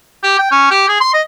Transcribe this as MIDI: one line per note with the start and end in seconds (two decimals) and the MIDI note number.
0.23 0.38 67
0.39 0.50 79
0.51 0.69 61
0.71 0.85 67
0.89 0.97 68
1.01 1.12 84
1.14 1.22 75